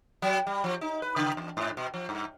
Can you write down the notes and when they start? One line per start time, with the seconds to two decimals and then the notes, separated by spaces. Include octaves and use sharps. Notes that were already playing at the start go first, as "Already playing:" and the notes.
0.22 F#3
0.47 G3
0.64 F3
0.81 D#4
1.02 B4
1.16 C#3
1.37 E2
1.57 G#2
1.77 B2
1.94 F3
2.09 G2